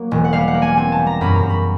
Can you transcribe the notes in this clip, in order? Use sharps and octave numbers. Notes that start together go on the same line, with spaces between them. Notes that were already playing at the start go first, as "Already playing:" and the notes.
Already playing: F#3 A#3
E1
F#5
G3 F5
F#5
A#3
G#5
C4 G#5
A5
G3
A#5
F#2 B5
A#5
F#2
B5